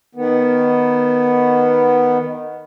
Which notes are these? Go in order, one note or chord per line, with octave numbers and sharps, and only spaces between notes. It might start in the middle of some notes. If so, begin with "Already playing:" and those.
D#3 B3